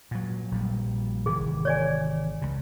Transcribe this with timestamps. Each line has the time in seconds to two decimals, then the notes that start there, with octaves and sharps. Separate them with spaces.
0.11 A#2 F#3
0.51 A#1 A#2 G3
1.26 G#1 C3 E3 G#4
1.65 C#5 D5 G#5
2.42 C#2 C#3